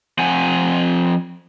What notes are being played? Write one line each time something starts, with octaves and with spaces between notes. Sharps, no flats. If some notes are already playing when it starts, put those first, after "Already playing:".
F3 C4 F#5 G#5